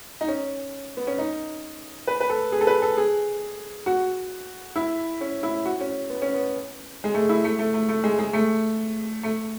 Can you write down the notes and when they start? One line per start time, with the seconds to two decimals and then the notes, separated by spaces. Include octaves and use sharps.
0.21 D#4
0.28 C#4
0.97 B3
1.07 C#4
1.19 D#4
2.07 B4
2.20 B4
2.29 A4
2.52 G#4
2.61 A4
2.67 B4
2.82 A4
2.97 G#4
3.86 F#4
4.76 E4
5.21 C#4
5.43 E4
5.65 F#4
5.80 C#4
6.10 B3
6.22 C#4
6.34 B3
7.04 G#3
7.14 A3
7.29 E4
7.44 A3
7.59 A3
7.74 A3
7.89 A3
8.04 G#3
8.19 G#3
8.33 A3
9.23 A3